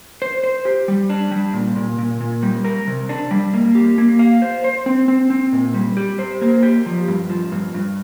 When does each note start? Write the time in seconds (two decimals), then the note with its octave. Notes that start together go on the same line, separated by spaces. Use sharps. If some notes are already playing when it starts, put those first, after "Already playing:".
0.22 C5
0.44 C5
0.65 G4
0.88 G3
1.10 D4
1.31 G3
1.53 A#2
1.76 A#2
1.98 A#2
2.21 A#2
2.43 G3
2.64 A#4
2.87 C3
3.09 D4
3.31 G3
3.54 A#3
3.75 G4
3.98 A#3
4.19 F5
4.42 C5
4.64 C5
4.86 C4
5.08 C4
5.30 C4
5.53 A#2
5.74 G3
5.97 G4
6.19 C5
6.42 A#3
6.63 G4
6.86 F3
7.08 G2
7.30 F3
7.52 G2
7.74 G2